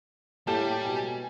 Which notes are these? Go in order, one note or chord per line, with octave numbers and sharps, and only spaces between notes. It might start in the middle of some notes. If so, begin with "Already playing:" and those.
A2 G3 A#3 G4 A4 A5
B2 G#5